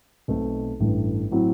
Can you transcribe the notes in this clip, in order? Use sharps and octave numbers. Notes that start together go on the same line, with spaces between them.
B1 B2 A3 C4
A1 G2 E3 A3
A2 F#3 C4 E4